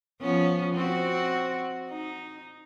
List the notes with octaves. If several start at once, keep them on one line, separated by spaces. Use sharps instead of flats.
F3 B3 C#4
C4 F#4
D#4